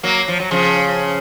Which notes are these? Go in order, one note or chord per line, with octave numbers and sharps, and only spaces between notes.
F#3 A#3
F3
F#3
C#3 F3